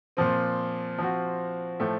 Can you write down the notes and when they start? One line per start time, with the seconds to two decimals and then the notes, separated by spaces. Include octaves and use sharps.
0.17 A#2 F3 C4
0.98 F3 C4 F#4
1.80 A2 F3 A3